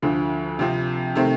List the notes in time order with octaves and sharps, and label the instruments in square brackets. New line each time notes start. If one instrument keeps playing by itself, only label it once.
[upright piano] D2 D3 F3
C3 F3 C4
C3 D#3 A3 C4